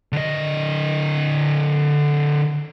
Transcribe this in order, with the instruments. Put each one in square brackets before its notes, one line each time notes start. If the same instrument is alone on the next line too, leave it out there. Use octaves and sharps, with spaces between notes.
[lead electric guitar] D3 D#5